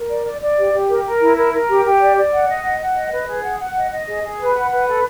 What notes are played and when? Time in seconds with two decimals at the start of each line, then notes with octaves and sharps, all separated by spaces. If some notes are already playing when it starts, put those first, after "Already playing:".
Already playing: A#4
0.10 D5
0.25 D5
0.42 D5
0.58 G4
0.73 G4
0.89 A#4
1.05 A#4
1.21 E4
1.37 A#4
1.53 A#4
1.69 G4
1.85 G4
2.01 D5
2.16 D5
2.32 F#5
2.48 D#5
2.64 F#5
2.80 F#5
2.96 D#5
3.12 B4
3.28 G#4
3.44 F#5
3.60 F#5
3.76 D#5
3.91 D#5
4.07 G#4
4.24 G#4
4.39 B4
4.56 F#5
4.71 B4
4.87 A4